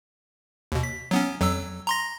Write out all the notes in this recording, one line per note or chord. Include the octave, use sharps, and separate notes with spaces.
D#2 B2
B6
F#3 B3 C#4
F2 F#3 E6
A#5 C6 A#6